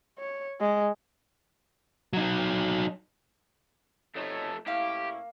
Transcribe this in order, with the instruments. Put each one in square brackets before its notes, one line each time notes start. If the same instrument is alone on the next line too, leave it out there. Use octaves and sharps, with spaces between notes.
[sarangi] C#5
G#3
[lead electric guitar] F#3 D#4
[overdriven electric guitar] F2 A3 [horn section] B2 D#4 C#5
[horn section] A2 C#4 E4 [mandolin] A#3 F5 [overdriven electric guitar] G4